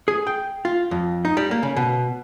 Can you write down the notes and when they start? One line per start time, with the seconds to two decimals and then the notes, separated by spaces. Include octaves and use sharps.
0.08 G#4
0.27 G5
0.65 F4
0.91 F2
1.25 D#4
1.37 G3
1.51 A#3
1.63 C#3
1.77 B2